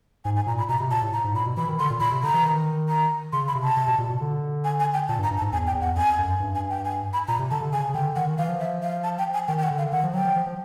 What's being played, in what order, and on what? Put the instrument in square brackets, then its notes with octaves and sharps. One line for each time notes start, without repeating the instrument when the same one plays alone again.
[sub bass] G#2 [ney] G#5
[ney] G#5
[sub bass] A#2 [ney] A#5
[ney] B5
[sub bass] B2 [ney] A#5
[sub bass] C3
[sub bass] A#2 [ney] A5
[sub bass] A2
[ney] A#5
[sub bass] G#2
[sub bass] A#2 [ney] B5
[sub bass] B2
[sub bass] E3 [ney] B5
[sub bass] D#3
[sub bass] D3 [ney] C6
[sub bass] A#2
[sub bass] A#2 [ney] B5
[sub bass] C3
[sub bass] D3 [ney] A#5
[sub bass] E3
D#3
[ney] A#5
[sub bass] C#3 [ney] C6
[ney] B5
[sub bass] C3
[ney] A5
[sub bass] C3
B2
A#2
B2
D3
[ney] G#5
G#5
G5
[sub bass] A#2 [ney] A5
[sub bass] G2
[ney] A#5
[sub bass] G2
[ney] A5
[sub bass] G#2
[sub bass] E2 [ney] G#5
[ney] G5
[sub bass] E2
[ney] F#5
[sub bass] F2 [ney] G#5
[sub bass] F#2
G2
[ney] G#5
G5
G#5
B5
[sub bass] A#2 [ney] A#5
[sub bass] C3
[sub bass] D3 [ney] A5
[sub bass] D3
[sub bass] C#3 [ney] G#5
[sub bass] C#3
[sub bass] D3 [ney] G5
[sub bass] D#3 [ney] F#5
[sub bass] D#3
[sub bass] E3 [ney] F5
[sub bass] F3
[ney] E5
F5
A5
G5
G#5
[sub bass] D#3 [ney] G5
[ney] G5
F#5
[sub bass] D3
[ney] F5
[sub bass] D#3 [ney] F#5
[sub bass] F3
[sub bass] F#3 [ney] G5
[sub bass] F3
F3
F3